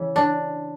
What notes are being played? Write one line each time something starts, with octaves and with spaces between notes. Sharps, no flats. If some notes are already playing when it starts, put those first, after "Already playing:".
Already playing: C#3 E3
D4